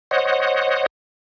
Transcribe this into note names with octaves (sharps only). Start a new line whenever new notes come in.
C5 C#5 D#5 F#5